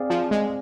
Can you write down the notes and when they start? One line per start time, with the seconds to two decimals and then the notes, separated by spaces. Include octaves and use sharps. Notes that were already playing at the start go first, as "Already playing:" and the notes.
Already playing: C4 G#4 D5 F5
0.10 F3
0.31 G#3